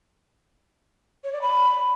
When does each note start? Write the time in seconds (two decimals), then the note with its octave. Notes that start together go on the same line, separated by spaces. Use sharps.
1.24 C#5
1.33 D5
1.42 B5